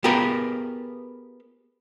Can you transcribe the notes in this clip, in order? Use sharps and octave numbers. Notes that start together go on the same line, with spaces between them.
B3 F4 G4 G#4 A#4 B4